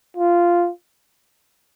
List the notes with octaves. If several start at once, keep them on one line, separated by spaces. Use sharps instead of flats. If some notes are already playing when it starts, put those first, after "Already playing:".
F4